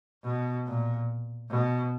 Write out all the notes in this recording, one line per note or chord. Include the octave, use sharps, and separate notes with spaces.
B2
A#2
B2